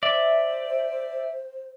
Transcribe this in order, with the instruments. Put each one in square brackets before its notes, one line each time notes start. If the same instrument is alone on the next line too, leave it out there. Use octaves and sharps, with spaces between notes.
[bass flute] C5 [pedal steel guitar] D5 [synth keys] E5